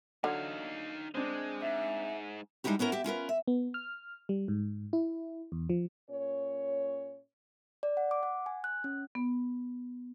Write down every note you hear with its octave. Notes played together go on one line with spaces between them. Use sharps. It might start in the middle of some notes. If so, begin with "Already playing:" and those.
D3 F#3 D#4 F5
G#3 C4 D4
G#2 E5
G3 G#3 D#4 E4 F#4 G4
B3 C#4 E4 A#4
G4 E5
C#4 F4 A#4 B4
E5
B3
F6
G3
G#2
E4
E2
F3
A#2 C#4 C#5
D5
F#5
D6
F#5
G#5
F#6
C#4
B3